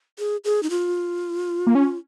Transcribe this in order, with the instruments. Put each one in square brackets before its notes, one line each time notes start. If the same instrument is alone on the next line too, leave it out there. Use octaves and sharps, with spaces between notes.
[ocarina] G#4
G#4
D#4
F4
[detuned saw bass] A#3
C#4